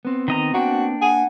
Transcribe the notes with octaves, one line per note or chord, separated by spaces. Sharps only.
B3 C4
D#3 D#5 A#5
A#3 D4 F#4 G5
F#5 G#5